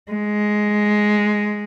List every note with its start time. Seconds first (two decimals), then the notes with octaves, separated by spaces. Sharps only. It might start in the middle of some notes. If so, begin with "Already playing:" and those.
0.11 G#3